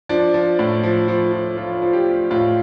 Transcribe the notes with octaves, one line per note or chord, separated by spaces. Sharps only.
F3 D4
F3
A2
F3
F3
F3
F3 F4
F3
G4
F3
A2 F4